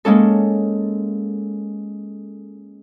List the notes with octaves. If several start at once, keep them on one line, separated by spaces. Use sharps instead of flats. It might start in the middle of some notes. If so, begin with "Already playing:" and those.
G#3 A#3 C#4 A4